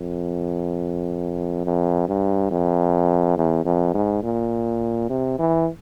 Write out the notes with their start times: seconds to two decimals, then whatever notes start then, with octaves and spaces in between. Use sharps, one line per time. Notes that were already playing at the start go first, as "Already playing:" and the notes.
Already playing: F2
1.65 F2
2.08 G2
2.51 F2
3.37 E2
3.66 F2
3.94 G#2
4.23 A#2
5.09 C3
5.39 E3